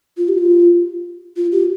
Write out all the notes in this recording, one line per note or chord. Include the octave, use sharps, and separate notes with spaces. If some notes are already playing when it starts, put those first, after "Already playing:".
F4
G4
F4
F4
G4